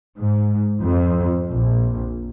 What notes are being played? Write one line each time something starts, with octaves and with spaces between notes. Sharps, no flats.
G#2
F2
A#1